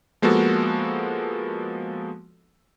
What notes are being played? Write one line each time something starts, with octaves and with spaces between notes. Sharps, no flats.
F3 G#3 A#3 B3 F#4 A4